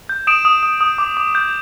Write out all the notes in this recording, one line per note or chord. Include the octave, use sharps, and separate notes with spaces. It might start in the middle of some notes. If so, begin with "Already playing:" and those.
G6
D#6 D7 E7
D#6
D#6
D#6
D6
D6
G6